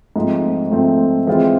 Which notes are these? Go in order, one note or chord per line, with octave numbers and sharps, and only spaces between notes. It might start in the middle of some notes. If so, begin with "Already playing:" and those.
G#2 F3 A3 C4
G#2 F3 A3 C4
E3 G#3 C4 F4